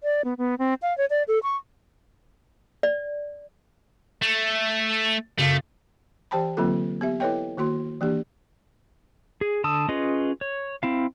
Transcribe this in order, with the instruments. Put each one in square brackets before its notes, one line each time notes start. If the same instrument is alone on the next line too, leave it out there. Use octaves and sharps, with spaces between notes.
[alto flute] D5
B3
B3
C4
F5
C#5
D5
A4
C#6
[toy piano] D5
[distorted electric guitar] A3
[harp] F#1 F5 C7 [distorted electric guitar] A3
[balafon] E3 G4 C5 G5 A5 B5
D3 F#3 A#3 C4 F4 A4
B3 G4 E5
E4 A4 B4 C#5 D#5 G5
D#3 A#3 F#4 C6
E3 A#3 D4 G4
[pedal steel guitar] G#4
D3 A5 D#6 E6
C#4 F4 G#4 B4 D#5
C#5
C4 E4 F5